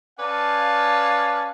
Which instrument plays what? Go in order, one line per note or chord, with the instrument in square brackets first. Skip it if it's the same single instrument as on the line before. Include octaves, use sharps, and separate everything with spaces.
[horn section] C#4 B4 D5 F5 A5